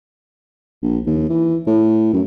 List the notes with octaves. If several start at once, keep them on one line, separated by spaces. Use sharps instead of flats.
A#1
D#2
E3
A2
F#2